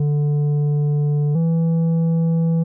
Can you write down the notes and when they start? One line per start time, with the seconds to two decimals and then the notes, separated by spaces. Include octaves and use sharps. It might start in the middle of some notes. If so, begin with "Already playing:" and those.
Already playing: D3
1.35 E3